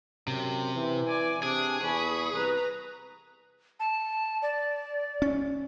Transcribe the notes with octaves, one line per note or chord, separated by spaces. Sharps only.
F#2 C3
E3
D5 G#5
C3 D4 G#4
E2 B5 C#6
C2 B4 A#5
A5
D5
C#4